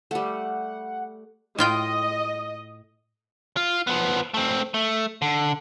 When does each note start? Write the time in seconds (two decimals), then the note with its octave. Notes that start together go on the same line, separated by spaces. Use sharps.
0.11 G3 A3 F#5
1.59 A2 F4 D#5 G5
3.57 F4
3.87 F3 B3
4.34 A3 C4
4.74 A3
5.22 D3